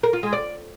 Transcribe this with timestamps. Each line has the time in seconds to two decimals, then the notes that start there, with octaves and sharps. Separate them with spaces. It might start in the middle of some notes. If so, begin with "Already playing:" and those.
0.03 A#4
0.13 F4
0.23 G#3
0.33 D5